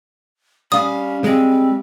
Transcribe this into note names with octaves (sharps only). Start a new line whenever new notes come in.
G3 C#4 F5 D#6
G#3 C4